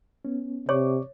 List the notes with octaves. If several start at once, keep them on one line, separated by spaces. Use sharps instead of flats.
B3 C#4
C3 C#5 D5 C#6 D6